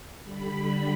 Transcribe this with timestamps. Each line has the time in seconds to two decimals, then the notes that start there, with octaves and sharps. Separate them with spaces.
0.23 D3 G3 B5